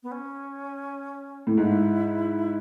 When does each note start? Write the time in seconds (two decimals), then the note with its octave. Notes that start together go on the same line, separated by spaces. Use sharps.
0.03 B3
0.12 C#4
1.47 A2
1.57 G#2 E4